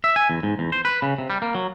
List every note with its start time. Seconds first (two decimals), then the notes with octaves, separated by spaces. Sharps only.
0.04 E5
0.16 G#5
0.30 E2
0.43 G#2
0.59 E2
0.72 C5
0.85 B4
1.02 C#3
1.18 C3
1.30 G3
1.42 A#3
1.55 F#3